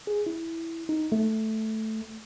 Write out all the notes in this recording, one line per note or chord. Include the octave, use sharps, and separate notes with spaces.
G#4
E4
D#4
A3